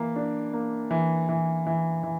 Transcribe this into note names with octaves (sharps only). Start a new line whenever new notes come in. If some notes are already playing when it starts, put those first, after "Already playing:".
Already playing: E3 A#3
D4
A#3
E3
E3
E3
E3